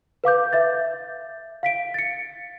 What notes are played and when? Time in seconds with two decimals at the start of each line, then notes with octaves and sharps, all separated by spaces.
0.24 B4 F5 D6 G6
0.53 E5 G6 A6
1.63 F5 B6 D7
1.94 A6 C#7